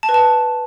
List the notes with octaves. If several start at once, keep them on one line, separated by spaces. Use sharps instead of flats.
A5
B4
A5